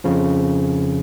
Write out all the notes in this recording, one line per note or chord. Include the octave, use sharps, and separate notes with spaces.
F2 C#3 F3